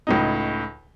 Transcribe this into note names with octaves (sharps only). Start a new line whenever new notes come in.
C#2 A2 D#4